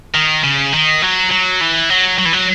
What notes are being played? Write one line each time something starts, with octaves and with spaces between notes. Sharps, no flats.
D#3
C#3
D#3
F#3
F#3
E3
F#3
F#3
E3
F#3